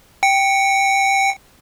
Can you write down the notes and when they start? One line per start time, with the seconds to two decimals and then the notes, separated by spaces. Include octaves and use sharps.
0.23 G5 C#7